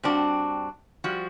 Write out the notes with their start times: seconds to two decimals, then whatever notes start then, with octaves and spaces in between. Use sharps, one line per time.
0.03 G2 C4 D4 F#4
1.04 F3 G3 F#4